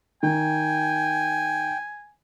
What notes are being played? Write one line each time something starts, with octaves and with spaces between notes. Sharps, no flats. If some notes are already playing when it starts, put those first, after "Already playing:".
D#3 G5 G#5